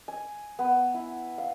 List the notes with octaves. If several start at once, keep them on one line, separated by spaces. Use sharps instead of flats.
G#5
B3
E4
F5